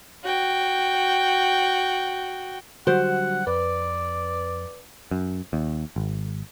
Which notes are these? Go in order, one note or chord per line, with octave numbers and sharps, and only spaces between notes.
F#4 G5
D3 F#3 G3 F#4 C5 F#5
F2 B4 D5
F#2
D#2
G#1